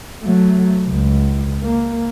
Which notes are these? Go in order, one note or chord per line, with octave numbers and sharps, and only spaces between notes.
F#3 A3
C#2
A#3